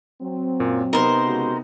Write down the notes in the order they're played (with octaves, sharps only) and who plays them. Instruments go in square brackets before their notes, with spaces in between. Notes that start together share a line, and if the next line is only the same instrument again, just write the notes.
[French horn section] F#3 C4
[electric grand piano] F#2 A#2 A#3
[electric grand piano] C3 B3 D#4 [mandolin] A#4 C5
[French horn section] C#3 G#3 F#4